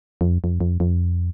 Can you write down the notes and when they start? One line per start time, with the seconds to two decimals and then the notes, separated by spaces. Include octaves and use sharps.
0.21 F2
0.44 F2
0.61 F2
0.80 F2